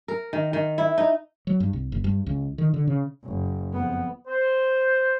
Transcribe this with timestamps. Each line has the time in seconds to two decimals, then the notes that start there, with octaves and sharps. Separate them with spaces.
0.08 A#4
0.33 D#3
0.53 D#3
0.78 E4
0.98 D#4
1.47 F#3
1.60 G2
1.73 C2
1.92 F#1
2.04 G2
2.27 C#2
2.58 D#3
2.74 D3
2.87 C#3
3.24 F#1
3.73 F2 B3
4.27 C5